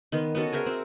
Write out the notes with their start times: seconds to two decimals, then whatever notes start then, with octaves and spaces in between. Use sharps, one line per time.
0.12 D#3 B3 C6
0.35 B3 C#4 F#4 A4
0.53 G#4 A#4 C5 E5
0.66 C4 F#4